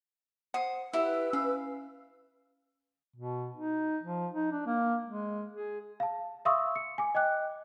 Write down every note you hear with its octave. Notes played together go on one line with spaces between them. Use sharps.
C5 F#5 D#6
E4 G4 B4 E6
C#4 F5
B2
D#4
F3
D#4
D4
A#3
G#3
G#4
F5 A5
E5 F5 C6 C#6 D#6 E6
C#7
G#5 D6
D#5 G5 D6 F#6